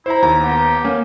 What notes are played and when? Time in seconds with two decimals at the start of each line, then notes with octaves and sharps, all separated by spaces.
0.06 E4 C5 A#5
0.22 D#2 A#5
0.41 B3 G4
0.84 A#3 C#4